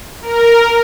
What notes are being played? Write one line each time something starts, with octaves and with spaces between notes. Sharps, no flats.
A#4